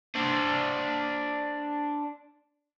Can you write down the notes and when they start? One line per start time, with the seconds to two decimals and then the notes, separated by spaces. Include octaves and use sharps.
0.15 D4 C5